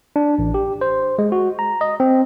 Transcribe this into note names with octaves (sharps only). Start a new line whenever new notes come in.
D4
A1
G4
C5
G#3
F#4
A#5
D#5
C4